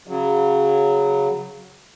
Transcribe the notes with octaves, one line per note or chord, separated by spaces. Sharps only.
C#3 F#3